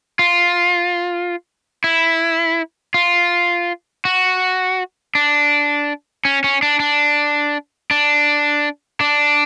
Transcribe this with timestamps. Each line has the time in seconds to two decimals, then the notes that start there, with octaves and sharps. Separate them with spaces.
0.19 F4
1.84 E4
2.94 F4
4.05 F#4
5.15 D4
6.25 C#4
6.44 C#4
6.63 D4
6.80 D4
7.91 D4
9.00 D4